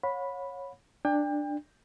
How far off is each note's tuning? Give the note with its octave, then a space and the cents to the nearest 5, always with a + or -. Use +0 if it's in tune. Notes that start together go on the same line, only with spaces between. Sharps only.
C#5 -10 F#5 -45 B5 +0
D4 +10 G5 +35